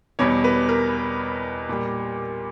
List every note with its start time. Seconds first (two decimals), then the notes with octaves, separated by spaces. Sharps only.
0.19 E2 B2 G3 C#5
0.44 B4
0.69 A#4
1.69 A#2 G3